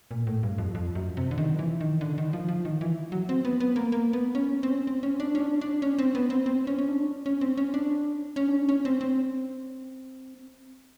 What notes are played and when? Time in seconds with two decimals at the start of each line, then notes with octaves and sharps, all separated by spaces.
0.11 A#2
0.27 A2
0.43 G2
0.58 F2
0.75 F2
0.95 F#2
1.17 C3
1.31 D3
1.38 D#3
1.54 F3
1.59 E3
1.81 D#3
2.01 D3
2.18 D#3
2.33 F3
2.48 F3
2.65 D#3
2.81 E3
3.12 F#3
3.29 C4
3.45 B3
3.60 B3
3.76 A#3
3.92 A#3
4.13 B3
4.35 C#4
4.63 C4
4.72 C#4
4.87 C4
5.03 C#4
5.20 D4
5.35 C#4
5.40 D4
5.61 D4
5.82 C#4
5.98 C4
6.15 B3
6.30 C4
6.46 C4
6.67 C#4
6.78 C#4
6.88 D4
7.26 C#4
7.41 C4
7.57 C#4
7.74 D4
8.36 C#4
8.48 D4
8.52 C#4
8.62 D4
8.69 C#4
8.85 C4
9.01 C4